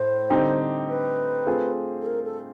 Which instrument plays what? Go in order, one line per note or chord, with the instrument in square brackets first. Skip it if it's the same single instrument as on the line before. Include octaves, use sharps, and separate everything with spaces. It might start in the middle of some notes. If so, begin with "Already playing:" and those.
Already playing: [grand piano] A2 [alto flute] C5
[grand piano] D3 G3 C4 D#4 G4
[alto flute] B4
[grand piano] A3 C4 F4 G#4
[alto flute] A4
A#4
A4